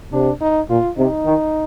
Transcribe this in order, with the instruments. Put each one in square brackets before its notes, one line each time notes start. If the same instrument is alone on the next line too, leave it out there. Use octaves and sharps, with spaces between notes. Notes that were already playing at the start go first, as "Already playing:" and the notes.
[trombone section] C3 [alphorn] D4
[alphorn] D#4
[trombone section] A#2 [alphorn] F4
[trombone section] C3 [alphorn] D#4
[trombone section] D#3